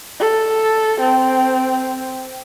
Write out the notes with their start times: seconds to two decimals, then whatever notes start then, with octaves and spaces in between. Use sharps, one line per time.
0.20 A4
1.01 C4